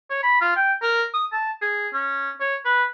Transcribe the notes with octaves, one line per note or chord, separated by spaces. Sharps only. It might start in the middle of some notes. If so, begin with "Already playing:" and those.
C#5
B5
F4
G5
A#4
D#6
A5
G#4
C#4
C#5
B4